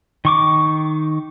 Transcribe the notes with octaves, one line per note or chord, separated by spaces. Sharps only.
D#3 C#6 D6